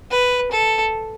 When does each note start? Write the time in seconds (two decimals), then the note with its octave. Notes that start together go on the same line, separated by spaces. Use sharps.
0.11 B4
0.51 A4